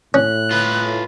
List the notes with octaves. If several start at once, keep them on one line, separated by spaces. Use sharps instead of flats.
A2 C#4 F#6
F4 B4